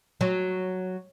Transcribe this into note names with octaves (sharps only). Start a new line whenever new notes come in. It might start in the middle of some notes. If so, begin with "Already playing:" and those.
F#3